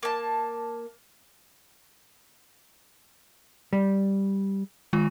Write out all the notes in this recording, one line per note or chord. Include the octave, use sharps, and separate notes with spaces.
A#3 A5
G3
D#3 G#3 F4